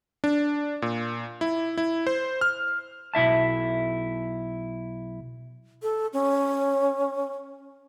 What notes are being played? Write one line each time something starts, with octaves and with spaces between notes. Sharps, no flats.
D4
A#2
E4
E4
C5
F6
B1 E4 E5 A5
A4
C#4